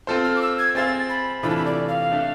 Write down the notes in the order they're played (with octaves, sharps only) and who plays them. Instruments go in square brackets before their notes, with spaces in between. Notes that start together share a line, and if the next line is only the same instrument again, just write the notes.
[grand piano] C4 F4 A4 C5
[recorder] F6
D6
E6
G#6
[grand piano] C4 G#4 C5 F5 [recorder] A6
[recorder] B5
[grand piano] C3 E3 A3 D4 F4 [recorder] B5
[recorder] A5
B5
D5
F5
[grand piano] A3 D4 A4 E5